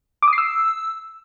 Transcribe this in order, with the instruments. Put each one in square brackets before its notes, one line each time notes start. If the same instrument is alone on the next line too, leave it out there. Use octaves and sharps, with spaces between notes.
[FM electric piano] D6
D#6
C7
E6